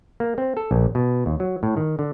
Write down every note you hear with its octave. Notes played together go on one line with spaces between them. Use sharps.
A#3
C4
A4
A#1
B2
D#2
F#3
A2
D#3
D3